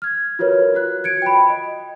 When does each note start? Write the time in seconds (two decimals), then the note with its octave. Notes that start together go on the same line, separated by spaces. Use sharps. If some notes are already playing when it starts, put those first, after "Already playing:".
0.02 F6 G#6
0.39 F4 F#4 A#4 B4 C#5
0.74 F4 F#4 F#6
1.04 G#6 C#7 D7
1.22 G5 B5
1.50 D#5